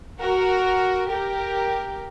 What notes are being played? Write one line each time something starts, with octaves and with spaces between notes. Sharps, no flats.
F#4 A#4
G4 A#4